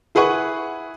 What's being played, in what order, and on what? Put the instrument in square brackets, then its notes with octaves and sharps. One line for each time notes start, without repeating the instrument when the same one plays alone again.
[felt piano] E4 G#4 B4 F#5 C#6